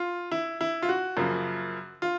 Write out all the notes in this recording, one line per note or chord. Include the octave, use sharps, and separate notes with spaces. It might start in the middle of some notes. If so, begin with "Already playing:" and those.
Already playing: F4
E4
E4
F4
F#4
F#2 C#3 F3 A#3
F4